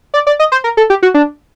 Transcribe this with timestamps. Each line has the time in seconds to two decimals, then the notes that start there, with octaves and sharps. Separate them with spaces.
0.14 D5
0.27 D5
0.40 D#5
0.52 C5
0.64 A#4
0.77 A4
0.90 G4
1.03 F#4
1.14 D4